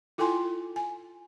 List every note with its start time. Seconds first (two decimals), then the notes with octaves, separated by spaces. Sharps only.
0.18 E4 F4 A4 G5 G#5 C6
0.76 G#5